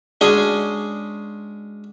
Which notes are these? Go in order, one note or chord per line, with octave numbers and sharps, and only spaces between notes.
G#3 C#4 D4 F#4 G#4 G#5